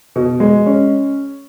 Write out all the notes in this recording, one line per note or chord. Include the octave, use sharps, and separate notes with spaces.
B2
G#3
C#4